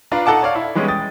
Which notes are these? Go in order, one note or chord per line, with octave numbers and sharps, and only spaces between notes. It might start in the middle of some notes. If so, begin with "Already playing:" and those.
D4 F4 B4 D5 A#5
D#4 A4 F#5 A5 D6
C#5 D5 F5
E4
E3 G3 G#3 B3 C#4
G5 D#6 A6